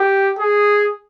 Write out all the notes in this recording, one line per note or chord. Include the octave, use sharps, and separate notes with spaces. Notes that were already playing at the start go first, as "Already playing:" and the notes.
Already playing: G4
G#4